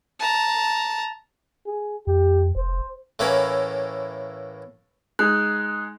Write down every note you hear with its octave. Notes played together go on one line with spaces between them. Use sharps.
A5 A#5
G#4
F2 G4
F1 C5
A2 E3 A#3 C#4 B5
G#3 D#4 F#6